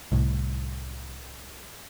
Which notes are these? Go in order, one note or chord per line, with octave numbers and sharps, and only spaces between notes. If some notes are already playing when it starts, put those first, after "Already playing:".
C2 A2